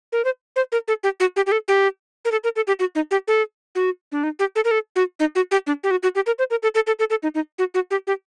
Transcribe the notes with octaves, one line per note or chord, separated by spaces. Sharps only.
A#4
C5
C5
A#4
A4
G4
F#4
G4
G4
A4
G4
A#4
A4
A#4
A4
G4
F#4
D#4
G4
A4
F#4
D4
D#4
G4
A4
A#4
A4
F#4
D#4
F#4
G4
D4
G4
F#4
F#4
G4
A#4
C5
A#4
A4
A4
A4
A4
A4
D#4
D#4
F#4
F#4
G4
G4